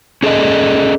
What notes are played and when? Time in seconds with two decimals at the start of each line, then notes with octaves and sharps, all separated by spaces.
0.23 C#4 G#4 A4 D5 D#5